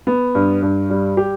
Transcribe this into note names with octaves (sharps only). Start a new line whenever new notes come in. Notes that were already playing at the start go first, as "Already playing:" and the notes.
B3
G2
G2
G3
G4